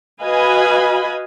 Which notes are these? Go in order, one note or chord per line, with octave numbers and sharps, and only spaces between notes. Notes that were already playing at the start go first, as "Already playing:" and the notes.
F#4 B4 D#5 F5 G#5 B5